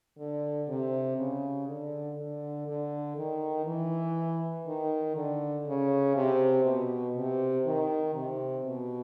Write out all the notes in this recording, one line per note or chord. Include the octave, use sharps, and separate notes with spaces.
D3
C3
C#3
D3
D3
D3
D#3
E3
D#3
D3
C#3
C3
B2
C3
D#3
C3
B2